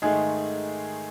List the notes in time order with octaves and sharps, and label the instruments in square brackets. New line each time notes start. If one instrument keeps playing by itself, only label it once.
[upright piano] G#2 D#3 G#3 A3 G#4